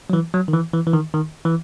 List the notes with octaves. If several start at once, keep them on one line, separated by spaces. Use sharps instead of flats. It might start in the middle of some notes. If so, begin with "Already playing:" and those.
F#3
E3
F#3
D#3
E3
E3
E3
D#3
D#3
E3